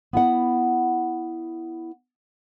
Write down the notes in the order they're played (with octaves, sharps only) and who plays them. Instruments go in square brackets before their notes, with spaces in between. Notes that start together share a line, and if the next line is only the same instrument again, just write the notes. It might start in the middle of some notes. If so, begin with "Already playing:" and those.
[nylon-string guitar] B3 E4 F#5